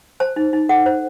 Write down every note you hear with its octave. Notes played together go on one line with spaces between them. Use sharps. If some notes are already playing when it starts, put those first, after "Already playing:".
C5 A5
D#4
D#4
A4 F#5
C5